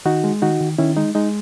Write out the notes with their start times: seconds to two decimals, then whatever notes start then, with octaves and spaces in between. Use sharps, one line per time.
0.05 D#3 D#4 F#4
0.24 G#3
0.42 D#3 D#4 F#4
0.61 D#3
0.78 D#3 C#4 E4
0.97 G#3 D#4
1.15 G#3 D#4